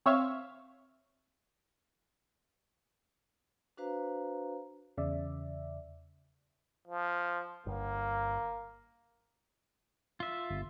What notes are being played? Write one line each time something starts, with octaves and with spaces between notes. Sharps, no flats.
C4 C#5 E5 F5
D4 F#4 B4 C5 F5 A#5
E2 C#3 D5 E5
F3
G1 A#3
F4 E5
G1